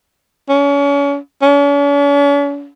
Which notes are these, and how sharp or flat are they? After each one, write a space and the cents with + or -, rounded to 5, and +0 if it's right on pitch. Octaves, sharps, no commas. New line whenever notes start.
C#4 +35
C#4 +45